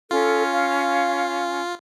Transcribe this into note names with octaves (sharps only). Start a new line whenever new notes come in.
C#4 F4 A4
F5